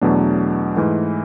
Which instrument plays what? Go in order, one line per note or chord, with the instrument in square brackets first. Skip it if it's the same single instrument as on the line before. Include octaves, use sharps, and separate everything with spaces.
[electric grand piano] E2 B2 F#3 A3 D4
G#2 E3 A3